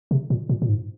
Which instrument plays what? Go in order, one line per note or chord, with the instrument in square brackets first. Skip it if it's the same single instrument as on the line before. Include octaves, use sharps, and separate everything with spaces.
[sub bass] C3
A#2
A#2
A#2
G#2